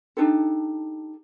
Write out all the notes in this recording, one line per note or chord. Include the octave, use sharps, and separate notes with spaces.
D4 D#4 G4 A4